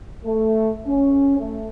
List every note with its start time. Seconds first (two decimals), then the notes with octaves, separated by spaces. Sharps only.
0.25 A3
0.86 C#4
1.39 A3